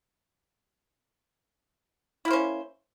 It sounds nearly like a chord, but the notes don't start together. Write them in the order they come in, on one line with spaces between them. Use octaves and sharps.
E4 A#3 C5 C#4